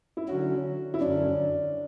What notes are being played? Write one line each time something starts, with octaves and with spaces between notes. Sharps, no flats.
E4
D3 F#3 C#4 F#4
E4
F#2 D3 F#3 C#4 D4